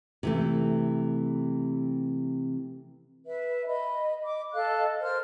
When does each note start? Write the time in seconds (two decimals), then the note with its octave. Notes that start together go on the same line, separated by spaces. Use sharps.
0.23 C3 E3 A3
3.26 B4 E5
3.67 D#5 B5
4.23 D#5 D6
4.53 A4 D#5 F5 F#6
5.01 A#4 C5 F6